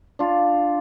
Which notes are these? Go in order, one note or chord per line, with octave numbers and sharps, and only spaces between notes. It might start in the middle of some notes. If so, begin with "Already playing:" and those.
D4 F4